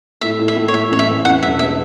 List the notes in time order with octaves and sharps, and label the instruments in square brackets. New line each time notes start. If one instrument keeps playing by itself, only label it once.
[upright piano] A2 [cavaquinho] E5
[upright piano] A2
[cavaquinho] E5
[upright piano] A2
[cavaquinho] C#5
[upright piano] A2 [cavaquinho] E5
[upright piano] A1 [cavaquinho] C#5
[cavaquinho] E5
[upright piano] A1
[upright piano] E2 [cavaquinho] F#5
[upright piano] E1 [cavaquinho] E5
[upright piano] B3 [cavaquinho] E5